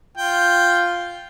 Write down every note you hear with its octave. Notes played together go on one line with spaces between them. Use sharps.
F4 G5